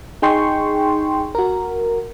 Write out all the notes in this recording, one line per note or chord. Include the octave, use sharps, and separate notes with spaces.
D#4 G#4 G5 C6 C#6
F#4 A#4